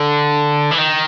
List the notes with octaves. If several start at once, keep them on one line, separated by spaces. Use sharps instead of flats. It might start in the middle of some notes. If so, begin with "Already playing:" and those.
Already playing: D3
E3
D#3